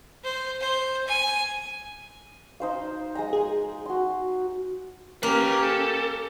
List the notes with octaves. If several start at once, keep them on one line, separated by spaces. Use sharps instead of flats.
C5
C5
G#5
D#4 C5 F5
G#3 G#5 A#5
G#4
F#4 C6
A#3 C#4 G4 B4 A#5
A4